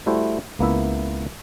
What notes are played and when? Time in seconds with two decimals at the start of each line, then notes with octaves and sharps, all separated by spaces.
0.06 G3 A3 E4 F#4 C5
0.59 C#2 A#3 B3 E4 E5